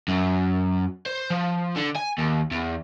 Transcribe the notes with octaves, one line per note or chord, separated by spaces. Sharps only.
F#2
C5
F3
D3
G#5
D#2
E2